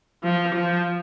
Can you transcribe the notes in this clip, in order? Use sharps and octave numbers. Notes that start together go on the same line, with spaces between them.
F3
F3